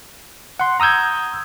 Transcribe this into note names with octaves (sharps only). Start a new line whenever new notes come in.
F#5 C6
A#5 D#6 E6 G6 G#6